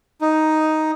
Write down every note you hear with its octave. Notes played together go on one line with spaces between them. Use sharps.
D#4